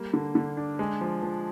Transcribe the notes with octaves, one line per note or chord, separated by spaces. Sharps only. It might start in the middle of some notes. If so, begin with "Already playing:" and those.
Already playing: G3 A#3
D3
D3
D4
G#3
F3
F3